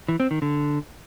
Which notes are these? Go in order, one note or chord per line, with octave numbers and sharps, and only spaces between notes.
E3
C4
D#3
D3